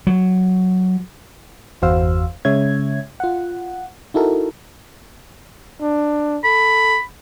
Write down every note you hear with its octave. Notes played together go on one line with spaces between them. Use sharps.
F#3
G1 E2 F#4 C5 F5 E6
C#3 G#3 C#4 C#5 E5 G#6
F4 F#5
D#4 E4 F#4 A4 A#4
D4
A4 B5